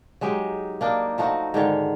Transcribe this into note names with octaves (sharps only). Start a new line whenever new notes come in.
F#3 G#3 D#4 G4
A#3 D4 D#4
F3 A3 D#4 F#4
G#2 D3 D#3 C#5